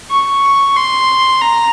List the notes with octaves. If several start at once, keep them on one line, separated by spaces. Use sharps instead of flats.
C#6
C6
A#5